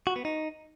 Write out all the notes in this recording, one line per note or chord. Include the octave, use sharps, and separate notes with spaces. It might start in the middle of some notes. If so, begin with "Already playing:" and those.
F#4
B3
D#4